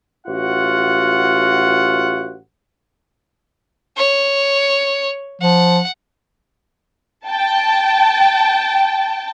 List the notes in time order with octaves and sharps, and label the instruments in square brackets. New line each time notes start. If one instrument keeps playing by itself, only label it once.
[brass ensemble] A1 F4 F#4 F#5
[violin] C#5
[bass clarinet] F3 [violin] F#5
[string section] G5 A5